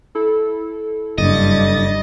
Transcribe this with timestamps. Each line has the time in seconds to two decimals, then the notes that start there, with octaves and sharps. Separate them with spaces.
0.15 E4 A4
1.18 F#1 G2 D#5 A6